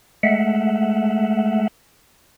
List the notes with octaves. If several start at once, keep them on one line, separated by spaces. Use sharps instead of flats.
G#3 A3 E5 F#5